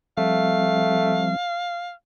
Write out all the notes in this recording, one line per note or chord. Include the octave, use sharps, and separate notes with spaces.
F3 G3 A3 C4 F5